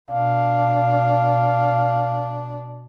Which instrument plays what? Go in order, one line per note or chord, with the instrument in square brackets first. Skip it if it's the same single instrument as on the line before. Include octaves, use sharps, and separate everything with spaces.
[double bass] B2 D4 [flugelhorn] F5